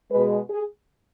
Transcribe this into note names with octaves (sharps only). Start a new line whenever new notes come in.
B2 G#3 B4
G#4